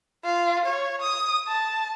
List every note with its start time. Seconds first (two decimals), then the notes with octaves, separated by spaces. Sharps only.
0.24 F4
0.66 C#5
1.02 D#6
1.48 A5